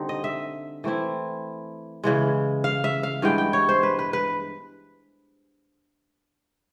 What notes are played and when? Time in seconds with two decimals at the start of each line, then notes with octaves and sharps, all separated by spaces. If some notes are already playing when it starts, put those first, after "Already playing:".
Already playing: D3 G3 C4 D#4
0.09 D#5
0.24 E5
0.84 E3 A3 C4 E4
2.04 C#3 E3 G#3
2.64 F5
2.84 E5
3.03 F5
3.22 G2 E3 G#3 B3 G5
3.38 G5
3.53 C#5
3.69 C5
3.83 B4
3.99 B4
4.13 B4